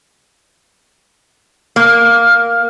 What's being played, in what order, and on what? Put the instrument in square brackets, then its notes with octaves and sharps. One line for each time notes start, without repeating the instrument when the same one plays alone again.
[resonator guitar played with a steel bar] A#3 [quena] F6